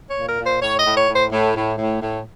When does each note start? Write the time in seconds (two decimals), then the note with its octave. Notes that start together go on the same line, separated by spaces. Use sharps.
0.11 C#5
0.16 A#2
0.28 A#4
0.39 A#2
0.45 C5
0.62 A2 C#5
0.80 D#5
0.86 A2
0.97 C#5
1.09 A2
1.14 C5
1.32 A2
1.55 A2
1.78 A2
2.01 A2